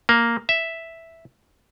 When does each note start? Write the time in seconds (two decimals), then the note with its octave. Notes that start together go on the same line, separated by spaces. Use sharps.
0.09 A#3
0.49 E5